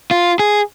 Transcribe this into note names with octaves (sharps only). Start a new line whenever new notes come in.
F4
G#4